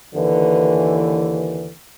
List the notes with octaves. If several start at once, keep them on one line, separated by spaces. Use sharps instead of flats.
D#2 D3 E3